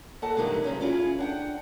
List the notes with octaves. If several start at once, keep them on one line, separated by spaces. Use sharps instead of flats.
D#2 A4 F#5 A5
G2 C3 D#3 E3 G#3
G2 C3 F#3 C#4
C#4 E4 F4 G#4
D4 F#5 G5